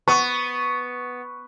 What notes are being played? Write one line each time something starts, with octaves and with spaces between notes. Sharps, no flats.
B3 C#6